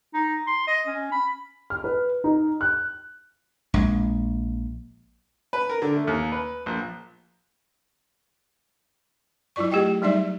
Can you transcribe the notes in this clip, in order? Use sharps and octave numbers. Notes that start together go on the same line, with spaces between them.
D#4
C6
D#5
C#4
B5
F6
B4
D#4
F#6
A#1 G#3
B4
A#4
D3
A3
D#2
B4
A#1
F#3 E4 F4 D5 C#6
A3 G4 G#4 D#5 G5
F#3 G3 D#4 D5 E5